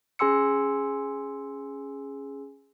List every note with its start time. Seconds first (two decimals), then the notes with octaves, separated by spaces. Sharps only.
0.19 C#4 G#4 G#5 C6 E6 C#7